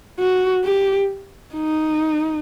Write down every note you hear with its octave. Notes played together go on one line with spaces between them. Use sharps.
F#4
G4
D#4